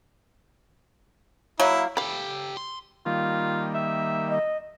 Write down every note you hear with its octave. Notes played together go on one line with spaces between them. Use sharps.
F#3 A#3 E4
G4 A4 F5 B5
C6
D#3 G3 A#3 F4
E5
D#5